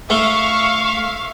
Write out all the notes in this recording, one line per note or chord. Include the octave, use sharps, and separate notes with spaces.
A3 E5 F5 C#6